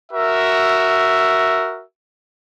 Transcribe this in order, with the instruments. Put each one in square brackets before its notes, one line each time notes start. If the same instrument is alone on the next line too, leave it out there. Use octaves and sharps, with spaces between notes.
[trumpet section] F#4 A#4 E5